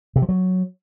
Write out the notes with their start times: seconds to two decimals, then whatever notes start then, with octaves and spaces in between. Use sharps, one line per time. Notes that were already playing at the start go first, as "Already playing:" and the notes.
0.16 C3
0.22 F3
0.29 F#3